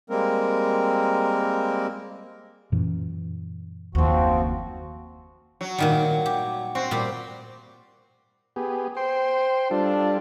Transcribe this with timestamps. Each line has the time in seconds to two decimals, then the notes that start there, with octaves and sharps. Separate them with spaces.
0.10 G3 G#3 A#3 C4 A#4
2.72 F#2 A#2 E3
3.95 F#1 D#2 F3 C4 F#4
5.61 F#3
5.78 A#2 D#3 G3
6.26 G4
6.75 C4 F#4
6.91 A#2 G3 G4
8.56 B3 G4 G#4
8.97 C5 G5 C6
9.71 G3 D4 F4 A4